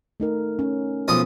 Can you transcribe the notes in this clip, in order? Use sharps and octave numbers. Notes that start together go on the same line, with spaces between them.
A3 D#4 A#4
C#4
B1 F3 D#6